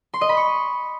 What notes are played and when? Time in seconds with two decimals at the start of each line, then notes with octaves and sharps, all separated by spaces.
0.14 C6
0.21 D#5
0.29 B5
0.37 C#6